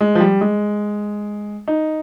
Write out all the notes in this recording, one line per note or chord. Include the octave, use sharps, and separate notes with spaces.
G#3
F3
G3
G#3
D#4